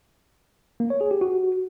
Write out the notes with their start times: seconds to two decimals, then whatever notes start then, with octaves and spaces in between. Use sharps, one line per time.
0.80 A#3
0.90 C#5
1.01 G#4
1.11 G4
1.21 F#4